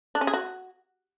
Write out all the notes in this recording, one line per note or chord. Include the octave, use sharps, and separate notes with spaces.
D4
C#4
G#4
F#4